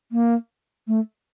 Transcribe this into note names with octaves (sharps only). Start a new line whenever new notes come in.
A#3
A3